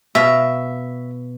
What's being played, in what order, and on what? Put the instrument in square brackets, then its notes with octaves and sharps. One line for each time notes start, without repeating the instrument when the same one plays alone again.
[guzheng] B2 F5 [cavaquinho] E5